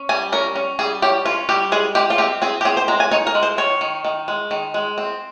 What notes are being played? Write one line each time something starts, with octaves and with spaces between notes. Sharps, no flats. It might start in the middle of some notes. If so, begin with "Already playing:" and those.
Already playing: C#4
G3 G#5
C#4 A#4
C#4
G3 G#4
C#4 G4
C#4 F4
G3 G4
G#3 G#4
G#3 G4
F4
C4 G4
C4 G#4
G4
C4 G#4
C5
G#3 A#5
G#5
D#4 C#5
A#4
G#3
C5
D#3 C#5
D#3
D#3
G#3
D#3
G#3
C4